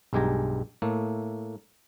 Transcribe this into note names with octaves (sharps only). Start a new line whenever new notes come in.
B1 G2 G#3 G4 G#5 A#5
A2 A3 A#3